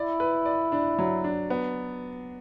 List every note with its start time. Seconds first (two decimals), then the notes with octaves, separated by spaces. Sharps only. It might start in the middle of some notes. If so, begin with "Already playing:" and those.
Already playing: E4 D5
0.20 B4
0.45 D5
0.72 D4
0.99 F#3
1.24 D4
1.50 B3